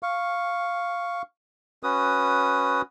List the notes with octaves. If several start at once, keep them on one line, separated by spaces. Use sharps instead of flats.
F5 C#6
C#4 F#4 B4 D#6